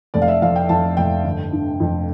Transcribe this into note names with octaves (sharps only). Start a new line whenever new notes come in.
F1 D5
F5
E5
F2 F5
G5
F2 A5
F1 G5
G1
D3
F2